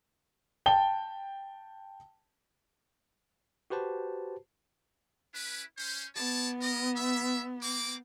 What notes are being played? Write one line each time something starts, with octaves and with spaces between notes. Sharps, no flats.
G5 A5 G7
F#4 G4 B4 C5 A5
C#4 E4 B4
C#4 C5
B3 C#5 D5 A5
A#4 D#5
E5
A#3 C4 D6